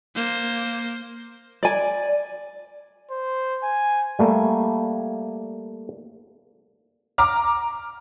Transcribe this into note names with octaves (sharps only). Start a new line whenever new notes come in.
A#3 C5
D5 G#5
C5
G#5
G3 A3 A#3
A#5 D6 F6